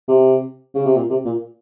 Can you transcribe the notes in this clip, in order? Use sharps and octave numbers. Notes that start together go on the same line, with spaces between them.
C3
C#3
C3
A#2
C3
A#2